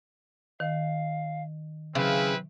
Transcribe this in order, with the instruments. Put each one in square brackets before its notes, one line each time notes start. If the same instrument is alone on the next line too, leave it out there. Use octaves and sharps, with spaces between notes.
[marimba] D#3 [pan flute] F5
[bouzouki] C#3 [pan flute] F#3 [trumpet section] C4 E4 B4